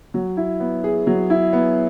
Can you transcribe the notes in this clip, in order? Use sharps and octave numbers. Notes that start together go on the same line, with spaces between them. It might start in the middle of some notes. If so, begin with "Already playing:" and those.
F#3
E4
B3
G#4
F#3
E4
B3